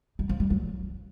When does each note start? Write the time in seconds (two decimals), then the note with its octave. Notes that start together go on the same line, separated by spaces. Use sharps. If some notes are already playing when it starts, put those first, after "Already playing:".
0.19 G3
0.29 F3
0.40 G3
0.50 F#3